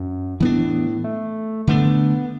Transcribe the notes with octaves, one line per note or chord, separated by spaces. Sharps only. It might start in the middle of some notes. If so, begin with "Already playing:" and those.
Already playing: F#2
A2 E3 B3 D4
A3
D3 A3 B3 D4